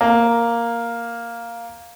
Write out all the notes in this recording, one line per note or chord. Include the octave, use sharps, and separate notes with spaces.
A#3